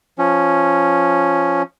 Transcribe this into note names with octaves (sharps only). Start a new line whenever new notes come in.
F3 C#4